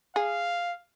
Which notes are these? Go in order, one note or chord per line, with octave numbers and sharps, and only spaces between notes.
G#4 F5